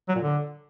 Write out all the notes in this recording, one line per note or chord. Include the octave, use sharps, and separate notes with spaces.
F#3
A#2
D3